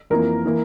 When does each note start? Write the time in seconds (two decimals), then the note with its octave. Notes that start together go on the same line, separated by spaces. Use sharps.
0.10 F2 E3 A#3 A#4
0.46 E3 A#3